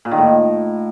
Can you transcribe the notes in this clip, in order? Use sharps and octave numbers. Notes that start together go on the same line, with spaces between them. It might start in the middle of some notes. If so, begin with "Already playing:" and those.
A#2
D#3
A2